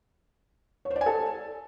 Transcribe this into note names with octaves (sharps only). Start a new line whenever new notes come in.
C#5
C5
D5
G#5
A4